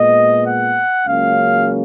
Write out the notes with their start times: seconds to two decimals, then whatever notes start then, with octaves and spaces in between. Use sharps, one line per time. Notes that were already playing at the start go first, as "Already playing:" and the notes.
Already playing: A#2 G#3 B3 D#5
0.45 F#5
1.06 C#2 C#3 F#3 A#3 C#4 F5